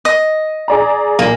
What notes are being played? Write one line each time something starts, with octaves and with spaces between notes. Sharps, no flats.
D#5
G#4 D5 A#5
B1 A#2 A#3